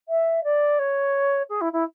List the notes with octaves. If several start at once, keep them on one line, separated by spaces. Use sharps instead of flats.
E5
D5
C#5
G#4
E4
E4